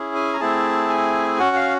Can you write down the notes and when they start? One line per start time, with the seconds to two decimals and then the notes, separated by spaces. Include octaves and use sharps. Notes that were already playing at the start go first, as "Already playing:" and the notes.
Already playing: C#4 E4 G#4
0.15 G#5
0.33 A#5
0.40 A3 C4 E4 G#4 A5
0.90 G#5
1.39 C#4 F#4 F#5
1.56 F5